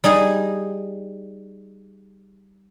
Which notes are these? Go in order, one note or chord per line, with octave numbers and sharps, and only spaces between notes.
G3 D#4 G#4 D#5